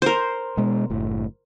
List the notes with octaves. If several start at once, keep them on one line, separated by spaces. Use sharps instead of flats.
A#4 C5
B2 G#3
F#1 A2